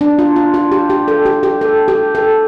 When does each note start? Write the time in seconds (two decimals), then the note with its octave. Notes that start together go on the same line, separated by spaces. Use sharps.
0.01 D4
0.19 F4
0.36 F4
0.54 F4
0.72 G4
0.90 G4
1.08 A4
1.26 G4
1.43 G4
1.61 A4
1.88 G4
2.15 A4